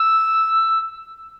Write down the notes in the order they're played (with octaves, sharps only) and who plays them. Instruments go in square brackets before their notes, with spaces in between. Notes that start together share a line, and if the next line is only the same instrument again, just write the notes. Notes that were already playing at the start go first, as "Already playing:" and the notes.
Already playing: [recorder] E6